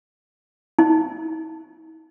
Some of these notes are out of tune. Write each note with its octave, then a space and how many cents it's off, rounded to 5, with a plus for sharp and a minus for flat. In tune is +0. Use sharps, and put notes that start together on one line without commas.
D#4 +45